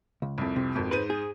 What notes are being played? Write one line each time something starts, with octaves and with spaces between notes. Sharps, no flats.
C#2
C2 F2
C3
G#1 F2
G#2 B4 C5 D#7
G#4